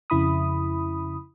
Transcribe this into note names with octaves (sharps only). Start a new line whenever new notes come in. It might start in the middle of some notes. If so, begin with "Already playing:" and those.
F2 C#3 E4 B5 D#6